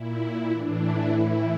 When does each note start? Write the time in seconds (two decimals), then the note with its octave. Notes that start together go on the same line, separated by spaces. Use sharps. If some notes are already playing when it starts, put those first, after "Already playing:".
Already playing: A#2 E4
0.51 A2 E3 D4
0.80 E4
1.09 A2 E3 E4